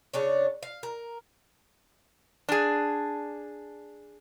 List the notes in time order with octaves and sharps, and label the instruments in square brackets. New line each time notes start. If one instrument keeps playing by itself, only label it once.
[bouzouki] C#3 D4 C#5
F5
A#4
[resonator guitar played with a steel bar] D4 G#4